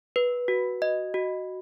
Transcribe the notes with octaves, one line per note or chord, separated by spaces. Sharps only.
B4
F#4
D#5
F#4